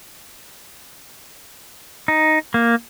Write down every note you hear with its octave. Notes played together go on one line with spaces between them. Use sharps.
D#4
A#3